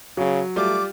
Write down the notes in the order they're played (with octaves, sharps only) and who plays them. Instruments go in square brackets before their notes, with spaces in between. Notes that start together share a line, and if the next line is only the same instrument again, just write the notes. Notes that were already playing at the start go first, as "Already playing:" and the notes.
[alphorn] C#3 [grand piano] F#3
[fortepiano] G3 F4 [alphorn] A3 [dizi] D6